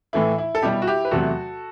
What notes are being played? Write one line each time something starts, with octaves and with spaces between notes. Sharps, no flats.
A2 E3 A3 E4
E4
A4
B2 G3 E4 G4
F#4
E4 G4
B4
E2 C3 F#3 A3 F#4 A4